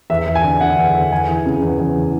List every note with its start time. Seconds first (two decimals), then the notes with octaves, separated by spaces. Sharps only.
0.10 E2 E5
0.27 E2
0.35 G#5
0.44 D3
0.61 D3 F#5
0.77 E2
0.94 E2
1.11 E2 G#5
1.28 E3
1.46 C#3
1.62 E2
1.80 E2
1.96 E3